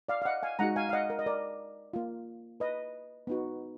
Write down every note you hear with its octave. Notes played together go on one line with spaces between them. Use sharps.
D5 F5
F5
D#5 F#5
F5 G#5
G#3 D#4 F#4 F#5 A#5
F5 G#5
F5
D#5 F#5
A#4
D#5
A#4 D5
A#3 F4
B4 D#5
B3 D#4 F#4